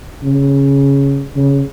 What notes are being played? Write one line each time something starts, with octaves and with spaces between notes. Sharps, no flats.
C#3
C#3